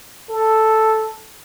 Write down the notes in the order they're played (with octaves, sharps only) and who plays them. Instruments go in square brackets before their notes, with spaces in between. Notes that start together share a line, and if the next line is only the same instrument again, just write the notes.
[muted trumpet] A4